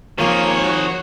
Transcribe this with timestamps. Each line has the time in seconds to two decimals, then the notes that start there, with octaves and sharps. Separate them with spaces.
0.18 D#3 F3 A#3 F4 G#4 C5 C#5
0.63 F#4